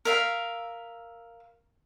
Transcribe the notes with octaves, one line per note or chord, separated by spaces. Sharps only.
A#4 E5 F5